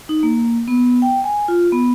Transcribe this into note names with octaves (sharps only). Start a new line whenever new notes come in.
D#4
A#3
B3
G5
G#5
F4
B3